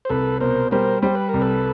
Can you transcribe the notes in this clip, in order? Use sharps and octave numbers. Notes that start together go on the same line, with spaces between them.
C5
C2 A4 B4
B2 A#4 C5
G3 A#4 C5
G3 C5
B4
C2 A#4
A4 B4